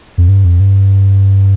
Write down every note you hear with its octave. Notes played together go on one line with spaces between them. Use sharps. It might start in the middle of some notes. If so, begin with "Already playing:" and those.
F2
G2
F2
G2